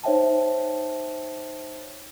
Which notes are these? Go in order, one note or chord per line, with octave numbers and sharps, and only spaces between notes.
D#4 C5 C#5 E5 G5 A5